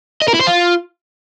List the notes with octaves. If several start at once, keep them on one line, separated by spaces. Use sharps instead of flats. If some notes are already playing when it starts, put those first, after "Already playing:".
D#5
A#4
E4
C5
F4